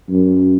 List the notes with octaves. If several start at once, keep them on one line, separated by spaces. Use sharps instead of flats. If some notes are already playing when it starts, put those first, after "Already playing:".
F#2